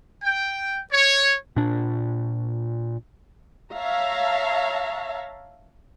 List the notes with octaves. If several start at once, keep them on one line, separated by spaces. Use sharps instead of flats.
G5
C#5
A#2 D4
C#5 E5 F5 A5 A#5